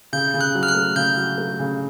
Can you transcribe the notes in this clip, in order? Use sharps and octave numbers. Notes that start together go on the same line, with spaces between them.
C#3 G6
C#3
F#6
F#3
F6
F#6
A3
C#3 G6
F#3
A3
C#3